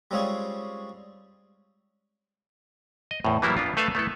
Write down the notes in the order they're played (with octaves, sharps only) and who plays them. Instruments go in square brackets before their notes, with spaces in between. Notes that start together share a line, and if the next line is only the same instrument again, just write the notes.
[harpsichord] G3 G#3 C4 C#4 F4 G#4
[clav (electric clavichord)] D#5
E2 A2
E3 F#3 G3 A#3 B3 E4
B3 D4 F4
A3 A4 B4 E5 F5
A3 B3 E4 A4